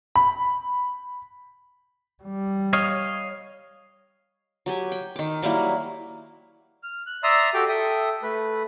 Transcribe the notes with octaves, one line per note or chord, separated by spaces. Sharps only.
B5
G3
C#5 D#5 F5
F#3 G4 G#5
G5
D#3 D6
F#3 G3 A#3 E4
F6
F#6
D5 E5 A#5 C6 D#6 E6
F#4 G4 A4 G5 D6
A4 E5 G5 D#6
A3 B4